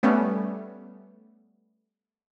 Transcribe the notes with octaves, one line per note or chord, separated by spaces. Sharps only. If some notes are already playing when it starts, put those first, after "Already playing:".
G3 A3 B3 C#4